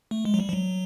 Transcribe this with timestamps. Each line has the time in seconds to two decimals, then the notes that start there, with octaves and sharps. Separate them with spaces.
0.11 A3
0.25 G#3
0.34 F#3
0.40 G3
0.49 F3
0.53 F#3